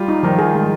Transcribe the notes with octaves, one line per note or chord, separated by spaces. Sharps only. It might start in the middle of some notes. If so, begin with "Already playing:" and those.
Already playing: G3 F4
D#4
D#3 F3
G#4
G#3